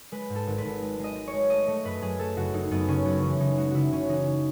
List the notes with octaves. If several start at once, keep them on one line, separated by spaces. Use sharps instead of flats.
G#3 B4
G#2
A4
G#1
B4
G#1
G#3
G#3 D#5
G#3
C#5
G#3
A3 D#5
A3
F#2 B4
F#2 G#4
A3 A4
F#1 F#4
F#2 D#4
F#2 B3
C#3 C#4
F#2 B3
E3 C#4
C#3 D#4
G#3 F#4
C#3 E4 F#4
C#3 C#4
E3 D#4